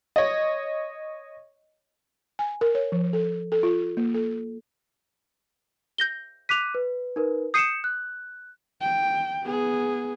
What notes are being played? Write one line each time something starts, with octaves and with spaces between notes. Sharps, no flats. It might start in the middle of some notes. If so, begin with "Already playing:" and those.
C#5 D#5
G#5
A#4
C#5
F3
A4
A4
F4
A#3
A4
G6 A#6 G7
D6 F#6 B6 D#7 F7
B4
D#4 A#4 B4
D#6 G6 C7 C#7 D#7 E7
F#6
G5
B3 G#4